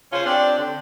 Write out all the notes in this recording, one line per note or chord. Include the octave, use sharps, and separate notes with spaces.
C#3 C#4 F4 C5
C4 D4 G4 D5
D3